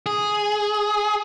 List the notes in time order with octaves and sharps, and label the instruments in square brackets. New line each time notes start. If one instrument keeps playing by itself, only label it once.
[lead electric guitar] G#4